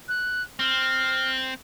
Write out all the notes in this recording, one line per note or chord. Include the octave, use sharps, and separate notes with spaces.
F#6
C4 F6